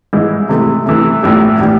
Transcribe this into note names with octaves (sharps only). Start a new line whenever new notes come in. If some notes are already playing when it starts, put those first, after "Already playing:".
G#2 E3 G#3
C3 E3 A3
C3 E3 A3
A#1 A2 E3 G3
A2 E3 G3